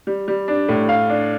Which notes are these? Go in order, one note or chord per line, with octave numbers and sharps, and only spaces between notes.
G3
G3
D4
A2
F5
D4